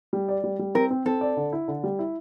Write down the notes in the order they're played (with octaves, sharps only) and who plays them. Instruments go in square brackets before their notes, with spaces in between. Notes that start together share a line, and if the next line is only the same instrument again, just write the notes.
[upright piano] G3
D5
G3
G3
[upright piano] C4 [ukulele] A#4
[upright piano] C4
[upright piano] C4 [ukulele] A4
[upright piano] D5
D3
E4
D3
G3
E4